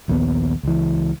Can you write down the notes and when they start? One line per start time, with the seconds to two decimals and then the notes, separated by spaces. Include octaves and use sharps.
0.08 A#1 D#2 E3 B3
0.63 C#2 E3